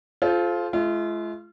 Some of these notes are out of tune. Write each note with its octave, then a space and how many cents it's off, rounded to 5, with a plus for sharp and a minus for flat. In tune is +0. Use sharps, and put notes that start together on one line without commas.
F4 +0 A4 -35 C5 +0
G#3 +45 F4 -35